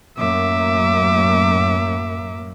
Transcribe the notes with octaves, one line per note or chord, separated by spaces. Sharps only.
F#2 A2 A#3 E5 D6